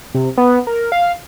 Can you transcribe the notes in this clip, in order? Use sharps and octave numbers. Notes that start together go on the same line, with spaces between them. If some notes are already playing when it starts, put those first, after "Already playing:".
C3
B3
A#4
F5